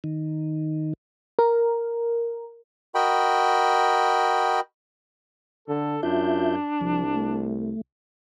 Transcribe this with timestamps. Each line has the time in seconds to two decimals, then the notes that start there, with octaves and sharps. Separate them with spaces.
0.04 D#3
1.39 A#4
2.95 F#4 A#4 D#5 G5 B5
5.68 D3 A4
6.03 F#2 D4 F4 E5 G6
6.81 C2 F3
7.15 A3